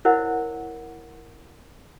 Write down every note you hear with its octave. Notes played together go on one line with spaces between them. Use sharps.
E4 A#4 C5 C#5 D#5 F#5